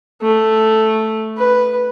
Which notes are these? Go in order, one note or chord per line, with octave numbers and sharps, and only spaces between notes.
A3
B4